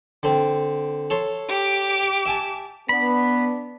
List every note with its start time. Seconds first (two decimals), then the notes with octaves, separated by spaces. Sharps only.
0.23 D3 C4
1.10 A4 C#5 C6
1.49 G4 D6
2.26 E5 G#5 A5
2.89 B3 D4 B5